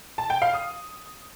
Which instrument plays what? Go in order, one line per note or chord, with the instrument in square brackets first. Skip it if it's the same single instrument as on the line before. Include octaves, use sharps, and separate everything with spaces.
[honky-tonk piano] A5
G5
F5
D#6